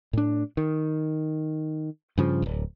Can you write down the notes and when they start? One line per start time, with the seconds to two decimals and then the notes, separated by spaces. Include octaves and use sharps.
0.13 A2 D4
0.57 D#3
2.18 G2 C#3 F3
2.42 D1 A#1